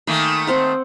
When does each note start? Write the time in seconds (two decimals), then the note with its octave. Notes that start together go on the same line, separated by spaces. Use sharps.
0.07 D#3 A3 A#3 G#5 B5
0.47 C4 C5 F#5